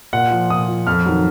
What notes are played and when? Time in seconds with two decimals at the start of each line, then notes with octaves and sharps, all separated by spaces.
0.13 A#2 F#5
0.31 F3
0.50 A#2 D#6
0.68 F3
0.87 F2 F6
1.06 D#3 F#3